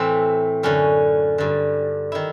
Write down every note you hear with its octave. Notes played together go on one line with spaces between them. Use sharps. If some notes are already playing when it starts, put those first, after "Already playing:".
Already playing: A2 E3 C4
F#2 D3 C#4
G2 D3
D#3 E4